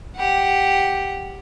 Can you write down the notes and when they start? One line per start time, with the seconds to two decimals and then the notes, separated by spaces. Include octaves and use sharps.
0.16 G4 F#5